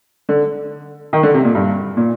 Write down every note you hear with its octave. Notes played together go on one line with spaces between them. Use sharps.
D3
D#3
D3
C3
A#2
G2
A#2